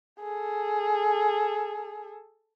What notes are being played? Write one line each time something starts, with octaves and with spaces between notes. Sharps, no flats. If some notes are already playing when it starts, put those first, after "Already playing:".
G#4 A4